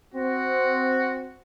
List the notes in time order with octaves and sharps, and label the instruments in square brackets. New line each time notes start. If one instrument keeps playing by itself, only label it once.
[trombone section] C4 [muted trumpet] F#4